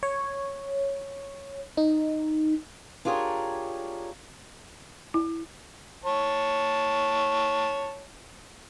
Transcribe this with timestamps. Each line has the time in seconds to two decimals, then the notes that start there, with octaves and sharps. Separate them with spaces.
0.03 C#5
1.77 D#4
3.05 D4 F4 G4 G#4 A#4 C#5
5.14 E4
6.05 C#5 A5